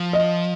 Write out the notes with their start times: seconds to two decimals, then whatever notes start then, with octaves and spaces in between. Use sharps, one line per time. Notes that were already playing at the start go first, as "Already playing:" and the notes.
Already playing: F3
0.13 D#5